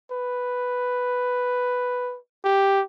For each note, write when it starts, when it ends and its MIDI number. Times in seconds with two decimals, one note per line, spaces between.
0.11 2.18 71
2.45 2.83 67